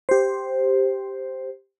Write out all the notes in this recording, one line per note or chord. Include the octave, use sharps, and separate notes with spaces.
G4 C5